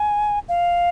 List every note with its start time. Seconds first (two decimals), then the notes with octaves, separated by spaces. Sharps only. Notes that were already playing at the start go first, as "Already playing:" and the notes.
Already playing: G#5
0.49 F5